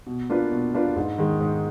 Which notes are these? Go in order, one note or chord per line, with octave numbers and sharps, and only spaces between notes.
B2
A#3 D4 F4 B4
B2
A#3 D4 F4 B4
G#2
D#3 G#3
G#2